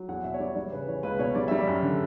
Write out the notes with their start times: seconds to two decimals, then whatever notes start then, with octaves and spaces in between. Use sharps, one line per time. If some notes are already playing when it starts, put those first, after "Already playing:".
Already playing: F#3
0.08 E2 F#5
0.24 B2 E5
0.34 C#5
0.40 G3 D5
0.56 G3 C#5
0.73 C#3 B4
0.88 E3 C#5
1.03 C#2 B4
1.19 B2 C#5
1.35 G3 D5
1.48 G3 E5
1.59 D5
1.67 F#2
1.83 D3